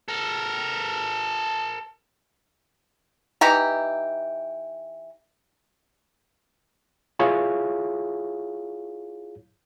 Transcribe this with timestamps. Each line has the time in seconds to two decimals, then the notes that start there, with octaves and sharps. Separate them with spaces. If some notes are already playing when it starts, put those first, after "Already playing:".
0.08 A4 A#4
3.41 E3 D#4 G4 A#5
7.19 E4 F4 G#4 C#5 F5